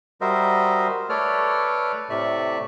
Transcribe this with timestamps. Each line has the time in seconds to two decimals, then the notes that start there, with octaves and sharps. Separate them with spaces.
0.21 G3 F#4 A#4 C5 D#5 E5
1.09 A3 A4 B4 C#5 D5 F6
2.10 A2 C3 A3 D5 E5 C#6